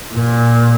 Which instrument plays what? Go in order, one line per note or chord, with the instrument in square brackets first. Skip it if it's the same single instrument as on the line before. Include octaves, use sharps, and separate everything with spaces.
[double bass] A#2